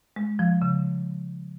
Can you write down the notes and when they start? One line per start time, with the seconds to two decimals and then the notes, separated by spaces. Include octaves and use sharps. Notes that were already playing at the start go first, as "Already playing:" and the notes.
0.16 G#3
0.39 F3
0.62 C#3